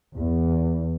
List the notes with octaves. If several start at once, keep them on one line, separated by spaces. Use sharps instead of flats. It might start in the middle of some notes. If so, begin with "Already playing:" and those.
E2